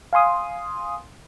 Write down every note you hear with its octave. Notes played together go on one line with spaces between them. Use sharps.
F5 G#5 C6 D#6